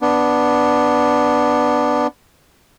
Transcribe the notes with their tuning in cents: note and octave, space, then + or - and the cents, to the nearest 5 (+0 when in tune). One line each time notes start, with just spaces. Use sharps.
B3 +0 D4 +5